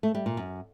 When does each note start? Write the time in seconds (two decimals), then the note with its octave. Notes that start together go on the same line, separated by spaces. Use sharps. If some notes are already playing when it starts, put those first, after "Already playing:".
0.03 A3
0.15 G3
0.26 A#2
0.37 F#2